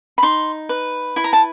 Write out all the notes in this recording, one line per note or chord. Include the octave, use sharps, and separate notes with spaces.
B5
D#4 C6
B4
E4 B5
A#5
A5